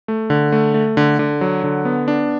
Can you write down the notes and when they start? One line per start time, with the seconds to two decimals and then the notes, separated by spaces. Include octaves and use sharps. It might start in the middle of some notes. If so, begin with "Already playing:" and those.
0.08 A3
0.30 D3
0.52 A3
0.74 A3
0.97 D3
1.19 D3
1.41 F#3
1.64 D3
1.85 B3
2.08 D4